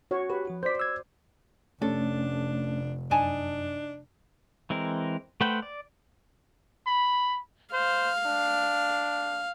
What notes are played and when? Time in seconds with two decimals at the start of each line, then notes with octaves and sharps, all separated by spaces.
0.11 F#4 C#5
0.30 G4 B4
0.47 F3 F#4
0.63 C5 D5 G6 B6
0.80 E6 G#6
1.82 F1 A3 C#4 D4 A4
3.11 F#2 D4 D#4 G#5 A5
4.70 E3 G#3 C4 A#4
5.41 A3 B4 C5 F#5 G5
5.62 D5
6.87 B5
7.73 C5 F5
8.26 D4